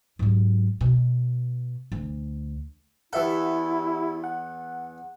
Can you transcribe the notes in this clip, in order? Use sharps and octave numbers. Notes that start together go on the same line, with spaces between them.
G#2 F#3
B2
D2
E2 E4 G4 A4 E5 F#5
F#5